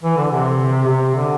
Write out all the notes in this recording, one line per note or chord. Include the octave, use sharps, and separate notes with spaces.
E3
D3
C3
C3
D3